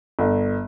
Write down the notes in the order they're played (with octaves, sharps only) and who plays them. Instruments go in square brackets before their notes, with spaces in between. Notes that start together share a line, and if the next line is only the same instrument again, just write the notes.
[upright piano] G1